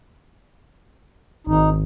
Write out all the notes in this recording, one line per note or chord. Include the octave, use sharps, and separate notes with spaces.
G#1 D#4